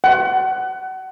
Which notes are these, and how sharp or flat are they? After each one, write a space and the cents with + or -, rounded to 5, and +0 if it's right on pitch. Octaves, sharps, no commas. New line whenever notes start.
F#5 +30